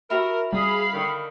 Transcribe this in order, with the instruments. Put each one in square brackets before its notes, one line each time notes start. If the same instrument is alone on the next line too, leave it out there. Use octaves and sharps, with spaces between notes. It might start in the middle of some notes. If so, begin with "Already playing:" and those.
[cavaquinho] E4 F#4 E5 [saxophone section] A#4
[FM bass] G3 [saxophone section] G#4 [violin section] F5 B5
[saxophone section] D3 D#3